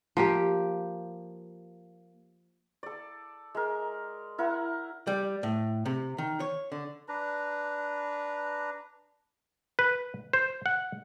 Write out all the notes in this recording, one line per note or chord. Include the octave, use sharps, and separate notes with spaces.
F3 A#3 G4
A4 D5
G#3 A#4
E4 A#4 F#5
G3
A2
C3
D#3
C#5
D3
D4 B4 A#5
B4
C5
F#5